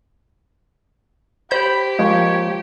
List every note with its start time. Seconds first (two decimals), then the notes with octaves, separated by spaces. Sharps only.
1.51 G4 C5 B5 G6
1.99 F3 G#3 A#3 C#5